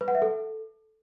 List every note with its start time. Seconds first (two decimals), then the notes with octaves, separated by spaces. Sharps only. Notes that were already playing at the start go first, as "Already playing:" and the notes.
0.01 B4
0.08 F#5
0.15 E5
0.22 A4